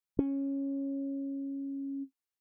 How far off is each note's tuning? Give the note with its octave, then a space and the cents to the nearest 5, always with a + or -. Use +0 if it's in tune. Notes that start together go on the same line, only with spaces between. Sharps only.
C#4 -10